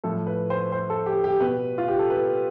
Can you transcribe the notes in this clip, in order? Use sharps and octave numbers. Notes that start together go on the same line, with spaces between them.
A2 F3 A4
B4
C5
C5
A4
G4
G4
B2 B4
F4
G4
A4
B4